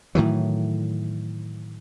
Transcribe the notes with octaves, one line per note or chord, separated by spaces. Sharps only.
A2 D#3 E3 F#3